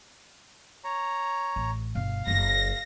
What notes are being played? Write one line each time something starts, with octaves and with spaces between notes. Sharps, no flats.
C#5 A#5
A1
G1 B2 F5
F#1 F#2 A#6